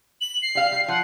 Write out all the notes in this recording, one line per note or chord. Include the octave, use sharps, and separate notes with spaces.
F#7
C7
G3 F5
G3
F3 F#5